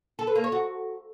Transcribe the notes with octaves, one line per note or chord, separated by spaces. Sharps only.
A4
B4
A#3
C#5
F#4